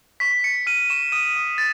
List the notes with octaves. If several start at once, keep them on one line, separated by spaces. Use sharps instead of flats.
C#6 B6
C#6 C#7
F6 D#7
C#6 E7
D#6 D#7
D#6
A6